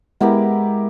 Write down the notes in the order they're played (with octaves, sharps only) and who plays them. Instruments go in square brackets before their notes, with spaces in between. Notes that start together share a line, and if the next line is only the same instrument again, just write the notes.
[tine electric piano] G#3 [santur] B3 E4 G4 A#4